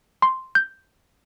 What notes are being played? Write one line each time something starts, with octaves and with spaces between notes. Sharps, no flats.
C6
G6